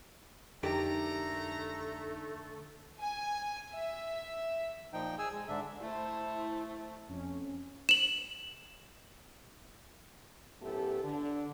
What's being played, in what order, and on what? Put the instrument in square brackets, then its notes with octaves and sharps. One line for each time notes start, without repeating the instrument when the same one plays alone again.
[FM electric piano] F2 D#4 [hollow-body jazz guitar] D3 G4 A#4 [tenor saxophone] A3 [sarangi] A#5
[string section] G#5
E5
[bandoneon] A#2 F3 D#4 G5
G#4 G#5 E6
G#3
G#2 D3 D4 E5
[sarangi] A3 [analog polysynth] E4 C5
[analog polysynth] F2 C#4
[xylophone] E7 F#7
[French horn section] F#2 A2 A3 B3 G4 A4
D3